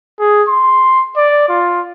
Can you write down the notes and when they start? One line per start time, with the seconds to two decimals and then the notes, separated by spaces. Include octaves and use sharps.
0.19 G#4
0.48 C6
1.17 D5
1.49 F4